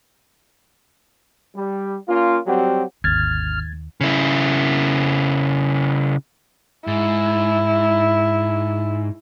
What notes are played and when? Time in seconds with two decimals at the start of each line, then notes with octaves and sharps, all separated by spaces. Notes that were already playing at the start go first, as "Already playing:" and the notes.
1.56 G3
2.08 A#3 C#4 F4
2.46 F#3 G3 C4 F#4 G4
3.04 G#1 D#2 D3 F6 G#6 A6
4.01 C#3 E4
6.87 G#2 E4